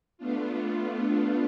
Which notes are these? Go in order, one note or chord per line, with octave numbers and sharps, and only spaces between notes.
A3 B3 D4 F4